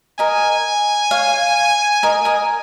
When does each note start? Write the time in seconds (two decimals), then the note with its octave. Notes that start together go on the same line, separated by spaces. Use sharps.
0.19 A#4 D#5 G#5
1.11 C#5 F5
2.03 A#4 D#5
2.25 A#4 D#5